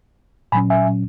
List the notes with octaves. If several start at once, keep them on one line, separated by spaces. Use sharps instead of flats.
A#2 F#3 C#4 G#5 B5
E5 G#5